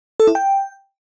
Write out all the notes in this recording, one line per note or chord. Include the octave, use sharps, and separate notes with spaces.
A4
E4
G5